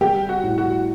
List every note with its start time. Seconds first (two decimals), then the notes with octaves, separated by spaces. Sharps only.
0.01 G3 G4
0.29 F#4
0.43 A2
0.58 F#4